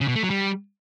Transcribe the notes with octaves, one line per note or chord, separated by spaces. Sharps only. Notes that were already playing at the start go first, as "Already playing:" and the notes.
C#3
B2
A3
F#3
G3